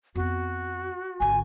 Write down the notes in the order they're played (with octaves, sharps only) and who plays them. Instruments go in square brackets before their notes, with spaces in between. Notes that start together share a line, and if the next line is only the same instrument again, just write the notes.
[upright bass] F2 B3 [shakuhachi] F#4
[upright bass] G#1 D3 [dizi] G#5